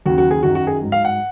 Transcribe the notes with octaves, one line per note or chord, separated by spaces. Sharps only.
D#2 C#3 F#3 F#4
F#4
G#4
F#2 D#3 F#3 F#4
F#4
G#4
G#2 F#3
F5
F#5